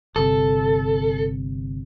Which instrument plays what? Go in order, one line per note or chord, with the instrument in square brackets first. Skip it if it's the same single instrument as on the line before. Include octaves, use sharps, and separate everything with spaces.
[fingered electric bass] G1 C3 [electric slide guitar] A4